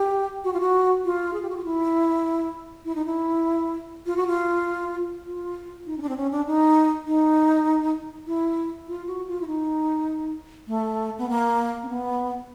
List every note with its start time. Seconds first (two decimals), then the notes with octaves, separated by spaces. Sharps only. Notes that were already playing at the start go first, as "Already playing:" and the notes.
Already playing: G4
0.44 F#4
0.53 F4
0.60 F#4
1.05 F4
1.33 G#4
1.42 G4
1.49 F#4
1.57 F4
1.65 E4
2.85 E4
2.95 D#4
3.06 E4
4.06 F4
4.17 F#4
4.27 F4
5.26 F4
5.86 D#4
5.98 C#4
6.02 D4
6.09 C4
6.17 C#4
6.31 D4
6.47 D#4
7.07 D#4
8.27 E4
8.88 F4
9.07 F#4
9.28 F4
9.41 E4
9.47 D#4
10.68 A3
11.18 B3
11.29 A#3
11.83 C4
11.89 B3